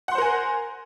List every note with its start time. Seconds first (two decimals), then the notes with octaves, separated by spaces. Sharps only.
0.08 F#5
0.12 C6
0.15 C5
0.18 A#4
0.22 G#5